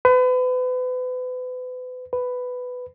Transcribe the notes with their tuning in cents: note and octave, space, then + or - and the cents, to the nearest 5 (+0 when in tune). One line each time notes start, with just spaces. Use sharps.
B4 +35
B4 +10